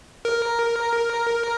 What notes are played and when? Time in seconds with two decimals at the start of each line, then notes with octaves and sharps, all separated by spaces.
0.25 A#4